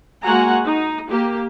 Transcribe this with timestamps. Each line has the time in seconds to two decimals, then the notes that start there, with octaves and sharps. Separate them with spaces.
0.23 G#3 A#3 F#4 F#5 G#5 A#5
0.65 D#4
1.11 A#3 G4